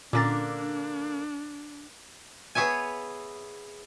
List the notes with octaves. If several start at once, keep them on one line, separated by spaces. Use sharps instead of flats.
A#2 D3 A#3 C#4 D4 A6
B3 G#4 C#5 E5 G#5